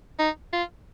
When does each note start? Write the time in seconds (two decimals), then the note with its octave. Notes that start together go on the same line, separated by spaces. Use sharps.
0.19 D#4
0.53 F4